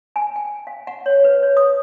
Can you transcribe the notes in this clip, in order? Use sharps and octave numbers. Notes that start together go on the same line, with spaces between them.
G#5
G5
F5
F#5
C#5
B4
C#5
D#6